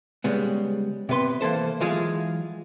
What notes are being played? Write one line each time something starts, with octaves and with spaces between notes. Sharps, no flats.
C#3 G3 G#3 B3
C3 B3 B4 C6
E3 A#3 A4 C5
E3 F#3 G#3 F4 G#4